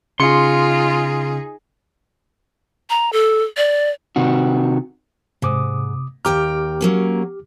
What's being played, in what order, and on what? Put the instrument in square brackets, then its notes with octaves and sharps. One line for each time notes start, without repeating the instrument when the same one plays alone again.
[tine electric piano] C#3 C#7 [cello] D#4 G#4 [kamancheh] F4 [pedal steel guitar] C6
[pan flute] A#5
A4
D5
[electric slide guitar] C3 D#3 F#4
[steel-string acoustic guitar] G#2 [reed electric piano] C3 D6 D#6
[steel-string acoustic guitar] D#2 G5 A#5 [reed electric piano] G4 D6 F6
[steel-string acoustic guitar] F#3 A#3 C#4